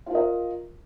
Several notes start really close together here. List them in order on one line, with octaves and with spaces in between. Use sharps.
F4 A#4 D#5